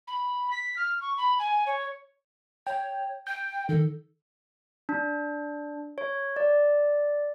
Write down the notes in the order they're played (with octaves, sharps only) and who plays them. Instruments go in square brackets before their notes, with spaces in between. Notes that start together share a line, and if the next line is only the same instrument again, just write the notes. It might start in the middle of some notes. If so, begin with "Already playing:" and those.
[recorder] B5
B6
F6
C#6
B5
G#5
C#5
[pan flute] C#5 [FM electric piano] G5
[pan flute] G5 [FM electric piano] G6
[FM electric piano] D#3 [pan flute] A4
[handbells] D4
C#5
D5